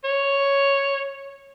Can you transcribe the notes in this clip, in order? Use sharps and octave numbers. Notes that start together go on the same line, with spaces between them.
C#5